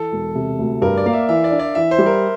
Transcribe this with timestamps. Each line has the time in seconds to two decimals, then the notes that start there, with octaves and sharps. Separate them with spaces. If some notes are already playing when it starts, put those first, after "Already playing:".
Already playing: E3 A4
0.12 E1
0.35 C3
0.59 D2
0.82 G2 A#4
0.97 D5
1.06 A#3 F5
1.13 E5
1.28 E3 E5
1.44 D5
1.51 D4
1.59 D5
1.75 E3 E5
1.91 C5
1.98 G3
2.06 A#4